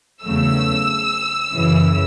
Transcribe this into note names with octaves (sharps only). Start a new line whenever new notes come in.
E2 C#3 F#3 A3 E6
F#2 C#3 E3